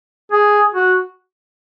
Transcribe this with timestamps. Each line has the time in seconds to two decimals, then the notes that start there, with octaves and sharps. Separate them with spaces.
0.32 G#4
0.74 F#4